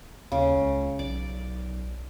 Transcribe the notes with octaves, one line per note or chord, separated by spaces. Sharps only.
D#2 C#3
C#2
B1 D5